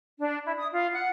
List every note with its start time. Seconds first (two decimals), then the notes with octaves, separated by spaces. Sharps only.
0.19 D4
0.45 E4
0.58 D#6
0.71 F4
0.92 F#5